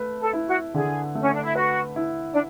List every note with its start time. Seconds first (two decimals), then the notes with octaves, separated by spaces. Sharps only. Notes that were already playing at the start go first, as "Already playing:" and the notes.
Already playing: A3 B4
0.20 A4
0.33 E4
0.47 F#4
0.74 D3 G#4
1.15 A3
1.20 C#4
1.32 D4
1.43 E4
1.56 F#4 B4
1.96 E4
2.33 D4